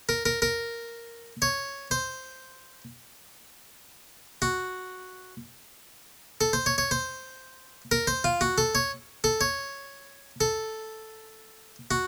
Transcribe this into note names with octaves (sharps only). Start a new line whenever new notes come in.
A#4
A#4
A#4
C#5
C5
F#4
A4
C5
C#5
C#5
C5
A#4
C5
F4
F#4
A4
C#5
A4
C#5
A4
F#4